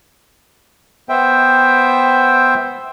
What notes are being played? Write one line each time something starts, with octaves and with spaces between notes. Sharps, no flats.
B3 C5 E5 G5